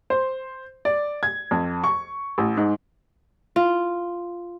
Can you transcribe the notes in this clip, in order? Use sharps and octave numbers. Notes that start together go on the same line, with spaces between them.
C5
D5
G#6
F2
C#6
A1
G#2
F4